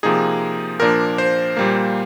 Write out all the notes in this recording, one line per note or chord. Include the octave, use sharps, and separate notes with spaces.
C3 F3 A#3 D#4 G#4
A#2 F3 A#3 D4 A#4
C5
A#2 G3 A#3